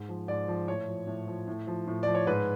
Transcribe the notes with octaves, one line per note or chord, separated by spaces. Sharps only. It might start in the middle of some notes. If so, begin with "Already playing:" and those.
Already playing: G#2
F3
G#2 D5
F3
A2 C#5
F3
A2
F3
A2
F3
A2
F3 D5
C#5
G#2 B4